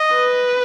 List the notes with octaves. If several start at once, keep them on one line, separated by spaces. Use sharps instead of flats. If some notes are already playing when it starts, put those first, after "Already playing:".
Already playing: D#5
B4